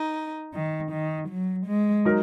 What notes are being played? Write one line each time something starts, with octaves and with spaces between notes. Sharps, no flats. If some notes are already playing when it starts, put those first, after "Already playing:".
Already playing: D#4
D#3
D#3
F#3
G#3
F#3 D#4 A#4